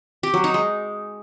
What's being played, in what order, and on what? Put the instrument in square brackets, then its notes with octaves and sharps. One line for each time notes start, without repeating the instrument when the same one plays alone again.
[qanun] G4
F#3
D#4
G#3